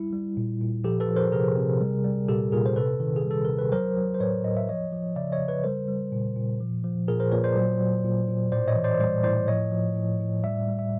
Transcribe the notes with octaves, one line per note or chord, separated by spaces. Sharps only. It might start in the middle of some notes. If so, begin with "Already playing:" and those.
Already playing: G3 E4
G3
A#2
A#2
F3 G4 A4
A4 B4
F3
A#4 C5
C3 G#4 A#4
C3
G3
G3
A#2 G4 A4
A#2 G#4 A#4
C5
C3 A4 B4
D#3
G#4
G3
A4
C3 A#4
B4
F#3 A#4 C5
F#3
C5
A2 B4 C#5
A2 D#5
E5
F3 C#5 D#5
F3
C#3 D5 E5
C#5 D#5
C#3
B4 C#5
G3 A#4 C5
G3
A#2
A#2
F3
F3
A#2 G#4 A#4
A#4 C5
A#2 B4 C#5
C5 D5
F#3
F#3
A#2
A#2
A2 C5 D5
C#5 D#5
E3
C5 D5
G3 C5 D5
A2 C5 D5
F3 C#5 D#5
F3
A2
A2
G3 D5 E5
G3
E5